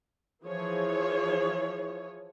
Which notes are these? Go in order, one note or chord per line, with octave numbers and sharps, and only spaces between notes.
E3 F3 G#4 C#5